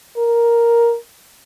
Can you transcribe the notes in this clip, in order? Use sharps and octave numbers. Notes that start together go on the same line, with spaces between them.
A#4